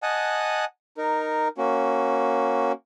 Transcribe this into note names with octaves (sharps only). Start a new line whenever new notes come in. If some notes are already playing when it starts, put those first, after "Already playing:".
D#5 F#5 G#5 A5 D#6 F#6
D#4 A#4
A#3 C#4 F#4